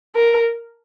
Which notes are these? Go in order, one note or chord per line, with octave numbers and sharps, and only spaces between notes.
A#4